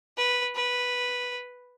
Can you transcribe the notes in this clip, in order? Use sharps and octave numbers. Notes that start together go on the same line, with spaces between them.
B4
B4